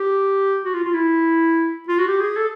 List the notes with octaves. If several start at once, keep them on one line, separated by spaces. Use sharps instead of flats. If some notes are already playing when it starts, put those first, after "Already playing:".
Already playing: G4
F#4
F4
F4
E4
F4
F#4
G4
G#4
A4